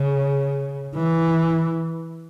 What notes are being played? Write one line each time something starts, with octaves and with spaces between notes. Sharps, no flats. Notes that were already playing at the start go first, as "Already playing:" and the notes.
Already playing: C#3
E3